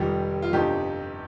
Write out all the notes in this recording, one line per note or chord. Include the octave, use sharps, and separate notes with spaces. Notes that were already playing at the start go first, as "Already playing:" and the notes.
Already playing: F1 F2 D#3 G3
F4
G1 F2 C3 D#4 G4